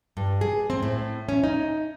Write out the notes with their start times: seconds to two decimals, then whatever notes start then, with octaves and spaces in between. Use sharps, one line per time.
0.17 G2
0.41 G#4
0.70 C4
0.83 A2
1.29 C#4
1.44 D#4